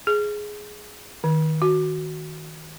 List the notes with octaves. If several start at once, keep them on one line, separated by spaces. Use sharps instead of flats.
G#4
D#3
F#4